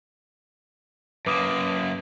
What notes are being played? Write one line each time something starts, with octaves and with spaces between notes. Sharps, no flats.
F#2 A#3 B4 D6 D#6